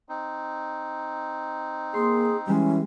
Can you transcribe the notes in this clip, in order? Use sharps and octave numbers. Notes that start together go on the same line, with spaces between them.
C4 D#4
A#3 G#4 C6
E3 G3 G#3 C#4